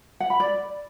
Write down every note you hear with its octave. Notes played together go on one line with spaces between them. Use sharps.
F#5
B5
D5